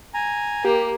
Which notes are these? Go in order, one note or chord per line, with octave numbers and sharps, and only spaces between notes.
G#5 A#5
A#3 G4